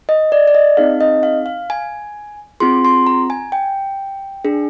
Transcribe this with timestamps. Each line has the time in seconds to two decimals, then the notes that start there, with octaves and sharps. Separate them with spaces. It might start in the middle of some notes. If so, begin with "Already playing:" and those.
0.09 D#5
0.32 D5
0.48 D5
0.55 D#5
0.77 C4 D#4 G#4 F5
1.01 D#5
1.23 F5
1.46 F5
1.70 G#5
2.60 C4 F4 G#4 C6
2.85 C6
3.07 A#5
3.30 G#5
3.52 G5
4.45 D4 G#4